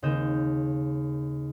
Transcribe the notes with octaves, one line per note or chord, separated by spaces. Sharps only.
D#2 C#3 C4 D#5 G6 E7